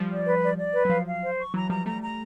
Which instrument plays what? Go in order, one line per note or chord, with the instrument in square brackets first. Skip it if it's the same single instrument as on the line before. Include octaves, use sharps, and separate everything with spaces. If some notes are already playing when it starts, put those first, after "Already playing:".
Already playing: [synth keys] F3 G3
[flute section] D5
B4
D5
D5
B4
[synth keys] F#3
[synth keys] F3 [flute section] F5
[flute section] F5
C5
C#6
[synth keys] E3 F#3 [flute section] A#5
[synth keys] F3 G3 [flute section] A#5
[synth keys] G3 A3 [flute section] A#5
[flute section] A#5